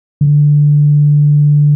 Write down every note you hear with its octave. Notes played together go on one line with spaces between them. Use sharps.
D3